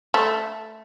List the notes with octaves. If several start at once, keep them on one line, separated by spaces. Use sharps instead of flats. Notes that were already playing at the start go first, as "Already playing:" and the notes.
A3